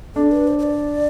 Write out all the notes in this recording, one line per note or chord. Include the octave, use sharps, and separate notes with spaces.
D4 A4
B4
C5
C5
D5